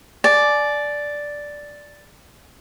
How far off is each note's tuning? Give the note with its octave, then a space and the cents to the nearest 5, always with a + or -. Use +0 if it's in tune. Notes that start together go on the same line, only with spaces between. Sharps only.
D5 +0 G#5 +40